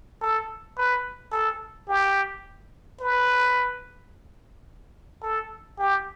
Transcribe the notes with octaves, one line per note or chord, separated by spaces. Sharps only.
A4
B4
A4
G4
B4
A4
G4